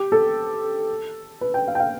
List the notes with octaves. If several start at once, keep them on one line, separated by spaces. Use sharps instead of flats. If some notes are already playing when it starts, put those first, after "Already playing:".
Already playing: G4
A4
B4
G5
F5
G5
F5